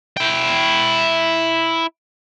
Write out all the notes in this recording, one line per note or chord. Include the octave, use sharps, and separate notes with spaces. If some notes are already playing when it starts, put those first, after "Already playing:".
E4 G5